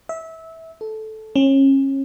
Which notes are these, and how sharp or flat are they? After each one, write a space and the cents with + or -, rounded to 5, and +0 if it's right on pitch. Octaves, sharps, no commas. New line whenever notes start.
E5 -20
A4 -10
C#4 -30